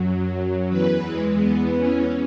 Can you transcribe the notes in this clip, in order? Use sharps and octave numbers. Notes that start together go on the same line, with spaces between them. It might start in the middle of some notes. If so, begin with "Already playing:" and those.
Already playing: F#2 F#3
E2 E3 B4
G#3
B3
C#4